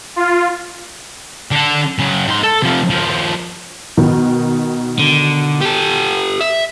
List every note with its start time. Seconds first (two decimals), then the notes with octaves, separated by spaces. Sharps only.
0.16 F4
1.51 D3 A4
1.99 C#3 F#3
2.27 G#2 C6
2.43 A4
2.62 C3 F3
2.90 D#2 F3
3.97 B2 D#3
4.99 D3
5.61 G4 A4
6.41 E5